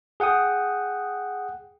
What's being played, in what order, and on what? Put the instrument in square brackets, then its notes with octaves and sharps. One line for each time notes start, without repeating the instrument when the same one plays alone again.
[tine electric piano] G#4 F#5 G5 D#6